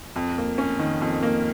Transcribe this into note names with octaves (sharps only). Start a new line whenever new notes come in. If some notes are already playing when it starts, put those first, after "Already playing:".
F2
A#3
C#4
D#3
F2
A#3